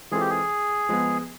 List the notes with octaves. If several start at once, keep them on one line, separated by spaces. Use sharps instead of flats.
E3 G#3 C4 F4 G#4 A4
G4
G#4
F3 G#3 B3